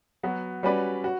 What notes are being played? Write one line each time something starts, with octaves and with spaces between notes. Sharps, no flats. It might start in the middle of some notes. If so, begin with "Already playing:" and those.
F#3 B3 F#4
G3 C#4 F#4 B4 D5
F#4